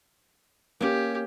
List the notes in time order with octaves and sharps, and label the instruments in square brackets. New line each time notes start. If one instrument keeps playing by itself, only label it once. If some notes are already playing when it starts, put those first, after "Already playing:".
[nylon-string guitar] A#3 C#4 [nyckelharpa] G4